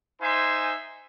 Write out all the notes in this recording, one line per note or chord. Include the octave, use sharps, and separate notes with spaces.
D#4 C5 E5 G#5 C6